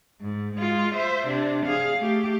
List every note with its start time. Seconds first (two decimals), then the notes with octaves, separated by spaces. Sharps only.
0.21 G#2
0.56 G#3 F4
0.96 C5 E5
1.27 C3 D4
1.66 G#4 F5
1.98 A3 G4